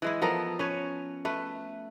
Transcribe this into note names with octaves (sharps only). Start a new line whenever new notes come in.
E3 G#3 E4
F3 B3 A4 A#4
C#4 B4 C#5
A3 B4